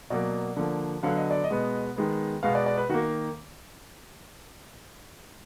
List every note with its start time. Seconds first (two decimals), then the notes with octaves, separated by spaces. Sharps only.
0.10 B2 F#3 A#3 D5
0.57 D3 F3 A#3
1.03 D3 F#3 B3 F5
1.17 D#5
1.31 D5
1.44 D#5
1.50 B2 G#3 B3
1.96 D#3 G#3 B3
2.43 B2 G#3 B3 F5
2.55 D5
2.66 D5
2.77 B4
2.89 D#3 F#4
2.94 A#3